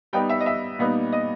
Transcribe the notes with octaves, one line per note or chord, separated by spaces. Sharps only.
G3 B3 D#4 G5
E5
D#5
E5
A#2 G3 B3 D#4
D#5